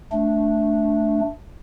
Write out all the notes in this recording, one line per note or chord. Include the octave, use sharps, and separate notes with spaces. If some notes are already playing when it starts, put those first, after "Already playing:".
A3 D4